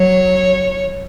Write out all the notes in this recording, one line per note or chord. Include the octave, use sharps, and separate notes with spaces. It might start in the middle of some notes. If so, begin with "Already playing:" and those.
Already playing: F#3 C#5